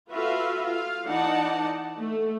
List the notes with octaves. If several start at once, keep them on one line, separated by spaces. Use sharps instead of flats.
F4 F#4 A4 B4 E5 F5
F4 F5
E3 D#4 D5 F#5 A5
A3